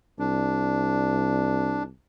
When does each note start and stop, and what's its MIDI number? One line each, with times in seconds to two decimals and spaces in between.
0.19 1.91 36
0.19 1.83 62